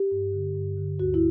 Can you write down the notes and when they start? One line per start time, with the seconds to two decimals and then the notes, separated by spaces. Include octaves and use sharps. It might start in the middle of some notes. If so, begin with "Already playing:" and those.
Already playing: G4
0.11 G2
0.33 D3
0.56 G2
0.77 D3
0.99 D2 F#4
1.14 E4